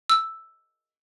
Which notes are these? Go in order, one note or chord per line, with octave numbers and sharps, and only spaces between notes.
E6